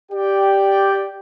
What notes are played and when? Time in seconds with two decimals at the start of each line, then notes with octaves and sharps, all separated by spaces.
0.12 G4 D5 G5